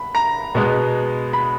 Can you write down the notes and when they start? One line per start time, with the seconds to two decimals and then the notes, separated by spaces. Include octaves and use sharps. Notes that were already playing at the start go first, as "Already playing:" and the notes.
Already playing: B5
0.15 A#5
0.55 B2 G#3 B3
1.33 B5